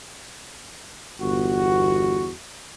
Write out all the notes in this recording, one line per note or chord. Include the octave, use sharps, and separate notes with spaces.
G1 E2 F#4